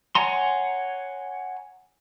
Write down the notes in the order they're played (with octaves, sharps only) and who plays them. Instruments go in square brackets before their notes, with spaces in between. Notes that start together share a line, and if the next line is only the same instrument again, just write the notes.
[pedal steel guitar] C#5 F#5 G#5 A#5 C6